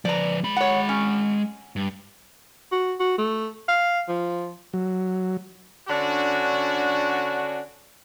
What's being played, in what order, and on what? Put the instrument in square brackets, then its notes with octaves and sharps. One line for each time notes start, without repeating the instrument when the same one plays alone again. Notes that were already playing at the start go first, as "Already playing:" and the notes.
[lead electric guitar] F3 B4 [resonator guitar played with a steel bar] D5 A#5
[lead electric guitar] G#3 B5
[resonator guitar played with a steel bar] C#5 F#5
C#4
[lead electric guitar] G2
[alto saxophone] F#4
F#4
A3
F5
F3
[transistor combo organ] F#3
[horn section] D3 C#4 D4 F#4